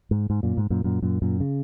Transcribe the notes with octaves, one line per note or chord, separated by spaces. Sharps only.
G#2
G#2
F#2 A#2
G#2
F#2 A#2
F#2 A#2
F#2 A#2
F#2 A#2
C#3